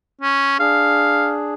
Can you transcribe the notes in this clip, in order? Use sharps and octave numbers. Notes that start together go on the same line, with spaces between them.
C#4
D4 G#4 F5